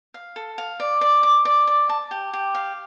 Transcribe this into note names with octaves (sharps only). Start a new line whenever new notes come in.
F5
A4
F5
D5
D5
D6
D5
D5
A5
G4
G4
F5